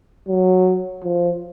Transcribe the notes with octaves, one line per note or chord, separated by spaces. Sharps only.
F#3
F3